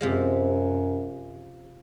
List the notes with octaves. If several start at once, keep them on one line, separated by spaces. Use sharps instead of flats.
F#2 C3 F3 G#3